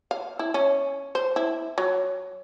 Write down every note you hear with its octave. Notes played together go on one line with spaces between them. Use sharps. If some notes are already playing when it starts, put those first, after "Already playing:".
F5
E4
C#4
C5
E4
F#3